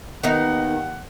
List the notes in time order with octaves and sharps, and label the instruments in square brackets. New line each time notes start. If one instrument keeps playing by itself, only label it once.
[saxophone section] D#2 F#5 [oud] D#3 B3 D#4